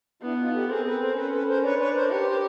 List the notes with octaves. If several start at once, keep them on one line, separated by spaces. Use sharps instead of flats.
B3 D4 E4
D#4 F4
G4 A4
C4 G#4 A#4
A4 B4
A#4 C5
C#4 A4 B4
A4 B4
A#4 C5
D4 B4 C#5
B4 C#5
A#4 C5
G4 B4 C#5
B4
A#4 C5